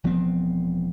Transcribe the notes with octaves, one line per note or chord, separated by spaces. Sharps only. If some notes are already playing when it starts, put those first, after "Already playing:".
E1 F3 B3 C4